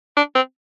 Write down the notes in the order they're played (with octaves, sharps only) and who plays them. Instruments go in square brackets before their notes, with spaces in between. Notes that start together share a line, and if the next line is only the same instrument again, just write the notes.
[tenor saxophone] D4
C4